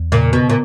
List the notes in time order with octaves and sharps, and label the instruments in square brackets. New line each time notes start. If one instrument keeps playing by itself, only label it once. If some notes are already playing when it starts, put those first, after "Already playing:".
Already playing: [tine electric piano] E2
[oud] A#2 [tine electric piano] C#3
[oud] B2 [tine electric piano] B3
[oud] A#2